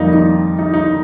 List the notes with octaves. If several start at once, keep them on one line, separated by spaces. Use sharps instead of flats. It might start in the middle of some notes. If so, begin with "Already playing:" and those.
Already playing: F2 D#3 G3 A#3 D#4 F4
D#4
D#4
D#4